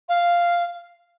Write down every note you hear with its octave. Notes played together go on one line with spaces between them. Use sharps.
F5